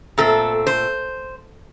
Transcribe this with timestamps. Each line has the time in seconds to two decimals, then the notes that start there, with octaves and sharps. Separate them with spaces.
0.18 A#2 A3 C4 A4
0.67 C5